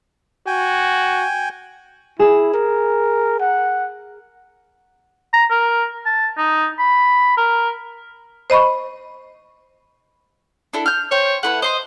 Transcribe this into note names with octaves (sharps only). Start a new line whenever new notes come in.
F#4 G5 G#5
E4 G#4 E7
A#4
F#5
A#5
A#4
A5
D#4
B5
A#4
C5 D#5 B5 C#6
D4 E4 A4
F6 G6
C5 C#5 G5
A3 E4 B4 F#5
C5 D#5 C6